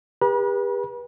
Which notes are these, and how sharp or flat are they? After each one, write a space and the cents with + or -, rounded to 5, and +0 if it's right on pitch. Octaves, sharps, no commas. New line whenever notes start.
G4 +40 B4 -30 B5 -45